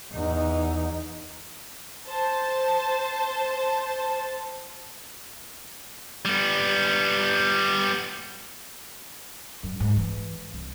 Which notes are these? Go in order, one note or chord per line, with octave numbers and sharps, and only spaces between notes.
E2 D#4
C5 A5
G3 B3
F#2
G#2
E3
C2